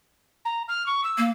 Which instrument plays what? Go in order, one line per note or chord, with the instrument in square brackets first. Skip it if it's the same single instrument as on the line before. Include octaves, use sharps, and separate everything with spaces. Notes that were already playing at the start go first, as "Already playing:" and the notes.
[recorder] A#5
F6
C#6
E6
[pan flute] A#3